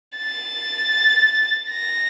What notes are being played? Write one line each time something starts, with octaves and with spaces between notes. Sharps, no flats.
A6
A#6